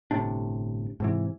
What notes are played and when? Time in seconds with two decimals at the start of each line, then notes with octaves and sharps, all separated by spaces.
0.11 G1 A2 C3 D4
1.00 G#2 C3 E3